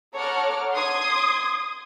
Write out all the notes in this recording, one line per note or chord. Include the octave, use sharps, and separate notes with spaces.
A4 C#5 F#5 A#5 D6 F6
C6 D#6 G#6